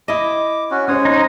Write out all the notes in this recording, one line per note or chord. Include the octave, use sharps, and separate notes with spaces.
E4 D#5 D6
C#4 F#4
G#3 C#4 C5 C#5 D#6
D#4